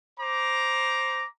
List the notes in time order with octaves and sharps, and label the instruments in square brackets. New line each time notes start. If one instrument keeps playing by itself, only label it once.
[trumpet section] C5 A#5 D6